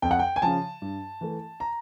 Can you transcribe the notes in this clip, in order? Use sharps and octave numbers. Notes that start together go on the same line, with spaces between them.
F2 G5
F#5
G5
G#5
C#3 F3 A5
G2
E3 A3
A#5